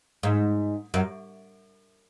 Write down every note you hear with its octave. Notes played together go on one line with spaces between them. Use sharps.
G#2
F#2